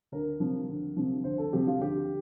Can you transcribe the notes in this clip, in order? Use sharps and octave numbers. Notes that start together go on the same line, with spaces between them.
D2 A#4
C3 F3
D2
C3 F3
D2 C5
A4
C3 F3 G4
F4
D2 G4